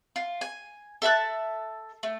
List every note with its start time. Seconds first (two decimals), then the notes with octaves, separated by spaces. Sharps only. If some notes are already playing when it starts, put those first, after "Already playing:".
0.16 F4
0.41 G#5
1.02 A4 E5 A5 F#6
2.03 A3